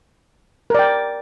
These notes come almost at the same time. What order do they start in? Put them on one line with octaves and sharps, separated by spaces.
A#4 D5 G5